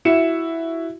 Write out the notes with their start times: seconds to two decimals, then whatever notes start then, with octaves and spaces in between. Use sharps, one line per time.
0.05 E4 F#4 C#7 E7